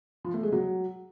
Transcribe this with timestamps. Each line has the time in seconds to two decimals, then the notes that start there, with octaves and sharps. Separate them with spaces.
0.25 F3
0.34 A3
0.43 G#3
0.52 F#3